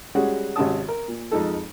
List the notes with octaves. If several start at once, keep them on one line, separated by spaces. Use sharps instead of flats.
G3 G#3 C#4 F#4 G#4
G#1 C3 C#4 F#4 A5 D#6
A#4
A#2
F2 G#3 D#4 A4